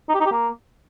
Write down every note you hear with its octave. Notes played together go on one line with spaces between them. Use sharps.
D#4
G4
D#4
G4
A#3